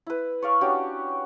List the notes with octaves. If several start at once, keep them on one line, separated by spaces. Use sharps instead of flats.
E4 B4
C#5 D5 F5 C#6
C#4 D4 F#4 G4